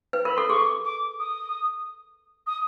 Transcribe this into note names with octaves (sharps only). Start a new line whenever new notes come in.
B4
A#4 B5
A4 C6
G#4 C#6
D6
D#6
D#6